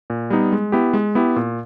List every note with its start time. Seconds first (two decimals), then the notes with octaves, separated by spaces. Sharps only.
0.10 A#2
0.30 G3 B3 D#4
0.52 G#3
0.72 B3 E4 G4
0.93 G#3
1.15 B3 E4 G4
1.36 A#2